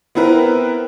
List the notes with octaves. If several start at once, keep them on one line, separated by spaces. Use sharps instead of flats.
B3 C4 E4 A#4 B4